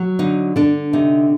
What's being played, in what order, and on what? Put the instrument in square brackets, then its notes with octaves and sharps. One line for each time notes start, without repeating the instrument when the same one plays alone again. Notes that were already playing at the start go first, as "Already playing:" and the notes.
Already playing: [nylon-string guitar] F#3
D3 D#4
D3 D4
C3 D#4